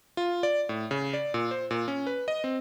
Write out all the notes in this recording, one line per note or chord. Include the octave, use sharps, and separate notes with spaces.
F4
D5
A2
C#3
D5
A#2
C5
A#2
C#4
B4
D#5
C4